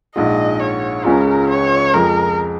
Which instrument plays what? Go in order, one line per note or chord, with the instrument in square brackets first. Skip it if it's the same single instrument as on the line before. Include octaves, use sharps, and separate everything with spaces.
[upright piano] A#1 G#2 G#3 F4 [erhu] D#5
[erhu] C#5
[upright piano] C#2 C#3 G#3 C#4 F4 [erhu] A#4
[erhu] C#5
[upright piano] F2 F3 G#3 [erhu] A#4